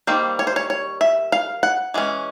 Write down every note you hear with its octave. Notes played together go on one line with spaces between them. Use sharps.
D#3 G3 A#3 C5
C#5
C5
C#5
C#5
E5
F5
F#5
E3 G#3 C#4